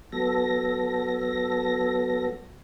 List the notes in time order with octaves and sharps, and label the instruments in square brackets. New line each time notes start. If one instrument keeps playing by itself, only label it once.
[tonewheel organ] F#3 B3 A4 A#6